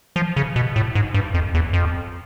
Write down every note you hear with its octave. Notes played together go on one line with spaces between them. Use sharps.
F3
C#3
B2
A2
G#2
G2
F2
E2
F2